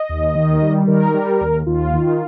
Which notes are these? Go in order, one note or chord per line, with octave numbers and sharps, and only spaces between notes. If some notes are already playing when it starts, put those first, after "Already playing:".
Already playing: D#5
D#2
D#3
G3
D#3 A#4
G3
D#2
D#2 F4
D#3